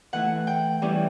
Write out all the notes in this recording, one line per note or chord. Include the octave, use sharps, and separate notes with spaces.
E3 A3 E4 F#5
G5
E3 G3 C#4 E4